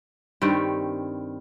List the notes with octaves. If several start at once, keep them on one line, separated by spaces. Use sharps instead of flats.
G2 D#3 G3 C4